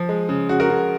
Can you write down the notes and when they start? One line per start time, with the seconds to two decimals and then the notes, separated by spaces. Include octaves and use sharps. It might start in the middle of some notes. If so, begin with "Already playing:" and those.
Already playing: F3
0.09 G#3
0.29 C#3
0.49 C#3 F#4
0.60 F#4 A#4
0.70 C#3 F#4